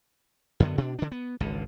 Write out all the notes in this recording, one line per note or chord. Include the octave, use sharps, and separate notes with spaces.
F#2 D3 B3
B2 D4
D3 D4
B3
G#1 C#2 D3